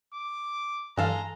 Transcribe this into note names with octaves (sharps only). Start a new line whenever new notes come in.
D6
G2 E3 G#3 A4 F5 A#5